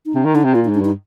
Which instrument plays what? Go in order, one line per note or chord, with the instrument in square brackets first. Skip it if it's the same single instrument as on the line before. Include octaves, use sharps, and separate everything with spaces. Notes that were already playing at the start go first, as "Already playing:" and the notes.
[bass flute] D#4
[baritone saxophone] C3 [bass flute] D4
[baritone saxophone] D#3
[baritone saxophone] D3 [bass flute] D#4
[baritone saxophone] C3
[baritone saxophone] A#2 [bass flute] F4
[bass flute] D#4
[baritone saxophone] G#2
[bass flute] D4
[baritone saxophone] G2 [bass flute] D#4